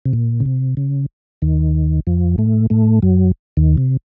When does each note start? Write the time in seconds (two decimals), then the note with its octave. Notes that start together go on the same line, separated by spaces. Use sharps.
0.06 C3
0.13 A#2
0.40 C#3
0.46 C3
0.77 C#3
1.42 D#2 D#3
2.07 F2 F3
2.38 A2 A3
2.70 A2 A3
3.02 F#2 F#3
3.57 D#2 D#3
3.77 C3